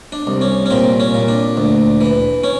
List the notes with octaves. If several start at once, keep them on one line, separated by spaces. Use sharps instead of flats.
D4
C2
C#4
C#4
A#2 C4
C#4
A#2
D4
D2
E3
C#4